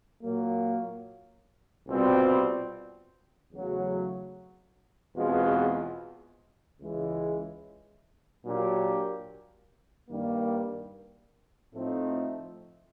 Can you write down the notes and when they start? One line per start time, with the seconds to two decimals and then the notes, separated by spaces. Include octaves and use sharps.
0.22 A#2 F#3 A#3
1.87 C2 B2 G3 C4 F4
3.51 E2 C#3 F#3 A3
5.16 E2 B2 G#3 C4 F4
6.80 C#2 C#3 E3 G#3
8.44 A#2 F#3 A#3 D4 G4
10.09 G2 D#3 G3 A#3
11.73 A2 F3 A3 C4 D#4